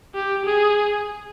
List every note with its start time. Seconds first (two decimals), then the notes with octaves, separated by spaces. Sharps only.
0.15 G4
0.45 G#4